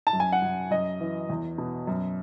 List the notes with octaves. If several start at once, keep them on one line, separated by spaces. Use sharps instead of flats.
A5
F#2
G#5
F#5
F#2
F#2 D#5
E3
E2
B2
F#2